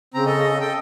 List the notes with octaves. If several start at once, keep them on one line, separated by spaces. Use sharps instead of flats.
C#3 C4 A#5
A4 D#5
A4 D#5 G5